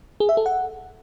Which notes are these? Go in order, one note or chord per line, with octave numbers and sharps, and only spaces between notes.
G#4
E5
A4
F#5